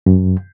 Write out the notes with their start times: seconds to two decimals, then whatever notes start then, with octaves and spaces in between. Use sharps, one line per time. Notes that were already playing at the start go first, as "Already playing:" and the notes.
0.06 F#2